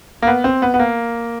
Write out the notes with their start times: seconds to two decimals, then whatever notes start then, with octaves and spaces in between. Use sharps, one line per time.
0.22 A#3
0.27 B3
0.44 C4
0.62 B3
0.74 B3
0.79 A#3